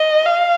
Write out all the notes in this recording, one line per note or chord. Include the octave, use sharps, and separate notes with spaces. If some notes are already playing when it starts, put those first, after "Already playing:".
Already playing: D#5
F5